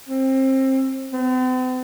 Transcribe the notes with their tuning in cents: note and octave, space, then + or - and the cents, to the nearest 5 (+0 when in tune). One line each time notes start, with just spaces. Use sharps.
C4 +25
C4 -45